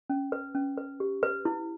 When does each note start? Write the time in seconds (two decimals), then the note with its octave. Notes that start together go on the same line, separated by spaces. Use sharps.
0.10 C#4
0.32 B4
0.55 C#4
0.77 B4
1.00 G4
1.23 B4
1.45 E4